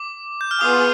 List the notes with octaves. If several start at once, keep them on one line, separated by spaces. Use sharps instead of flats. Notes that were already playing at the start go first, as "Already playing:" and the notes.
Already playing: D6
G6
F6
B3 F4 G#4 D#6